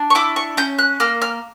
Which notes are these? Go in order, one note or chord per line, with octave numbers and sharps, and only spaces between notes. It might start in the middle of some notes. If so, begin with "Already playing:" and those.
Already playing: D4
C#6
E4 D6
C#6
C#4 G6
F#6
A#3 F6
F6